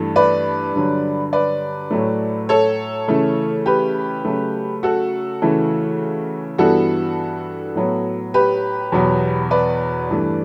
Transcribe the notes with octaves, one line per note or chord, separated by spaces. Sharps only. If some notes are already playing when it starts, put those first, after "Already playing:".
Already playing: G2 E3 A3
B4 D5
G2 D3 F#3
B4 D5
A2 F#3 A3
A4 C#5
C#3 E3 A3
G4 B4
C#3 F#3 A3
F#4 A4
C#3 E3 A3
G2 E3 G3 B3 F#4 A4
A2 F#3 B3
G4 B4
E2 B2 F#3 B3
B4 D5
G2 E3 A3